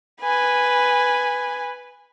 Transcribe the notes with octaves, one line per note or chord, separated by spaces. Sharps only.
B4 G#5